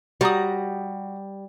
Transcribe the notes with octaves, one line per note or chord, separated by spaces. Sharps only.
G3 F#4 A#5 D#6